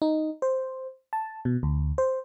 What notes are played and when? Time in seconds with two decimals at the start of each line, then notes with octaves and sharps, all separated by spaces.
0.02 D#4
0.42 C5
1.13 A5
1.45 B2
1.63 D2
1.98 C5